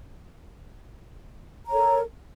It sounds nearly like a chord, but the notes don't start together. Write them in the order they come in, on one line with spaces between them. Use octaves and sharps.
A#5 C#5 A4 A#4